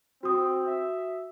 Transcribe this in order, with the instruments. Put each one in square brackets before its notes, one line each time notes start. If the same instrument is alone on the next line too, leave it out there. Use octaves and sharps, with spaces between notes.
[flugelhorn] C4 [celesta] F#4 D#6
[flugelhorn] E5